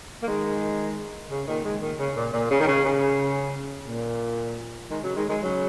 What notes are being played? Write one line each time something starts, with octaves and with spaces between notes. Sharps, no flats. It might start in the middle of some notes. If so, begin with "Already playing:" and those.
A#3
D#3 G#3
C#3
A#2 D#3
D#3 G#3
A#2 D#3
C#3
A#2
A#2
C#3
D#3
C#3
C#3
A#2
D#3 G#3
C#3 F#3
D#3 G#3
D#3 G#3
C#3 F#3